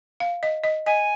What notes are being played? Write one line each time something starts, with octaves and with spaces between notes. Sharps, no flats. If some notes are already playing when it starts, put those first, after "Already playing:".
F5
D#5
D#5
D#5 G#5